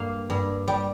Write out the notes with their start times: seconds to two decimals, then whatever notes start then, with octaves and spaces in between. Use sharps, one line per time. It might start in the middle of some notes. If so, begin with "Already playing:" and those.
Already playing: G2 A#3 F5
0.30 G2
0.68 G3